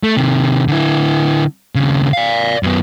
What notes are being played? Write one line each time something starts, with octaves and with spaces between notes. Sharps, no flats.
A3
C3 D#3
D3 E4
D#2 C#3
D5 F5
F#2 B3